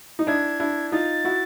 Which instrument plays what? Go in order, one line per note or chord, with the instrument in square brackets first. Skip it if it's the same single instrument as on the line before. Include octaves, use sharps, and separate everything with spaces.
[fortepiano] D#4
[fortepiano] D4 E4 [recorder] G#6
[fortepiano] D4 E4
[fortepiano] D#4 F4 [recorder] A6
[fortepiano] E4 F#4